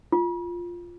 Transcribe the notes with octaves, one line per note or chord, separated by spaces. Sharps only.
F4